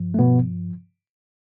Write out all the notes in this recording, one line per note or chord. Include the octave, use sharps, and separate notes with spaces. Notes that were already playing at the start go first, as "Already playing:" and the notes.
Already playing: G2 F3
A3
B2 B3